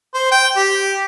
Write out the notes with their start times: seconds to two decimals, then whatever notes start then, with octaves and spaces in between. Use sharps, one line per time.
0.14 C5
0.31 G5
0.57 G4